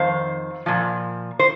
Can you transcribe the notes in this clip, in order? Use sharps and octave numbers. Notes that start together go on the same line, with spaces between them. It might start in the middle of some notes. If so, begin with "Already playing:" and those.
Already playing: F2 D#3 C5 F5
A#2 F3
C5